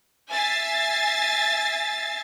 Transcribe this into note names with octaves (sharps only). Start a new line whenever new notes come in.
E5 G#5 A6 C7